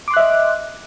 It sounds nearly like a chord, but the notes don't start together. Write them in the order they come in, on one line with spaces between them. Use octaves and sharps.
D6 C6 F#6 E5 D#5